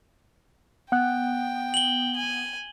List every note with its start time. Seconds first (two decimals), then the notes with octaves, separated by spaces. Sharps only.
0.92 B3 F#5 G5 F#6
1.74 F#7 G7
2.16 G#5